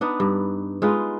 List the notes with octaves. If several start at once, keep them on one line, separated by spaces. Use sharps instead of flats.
B3 D4 D#4 B4
G2
G#3 D#4 F4 B4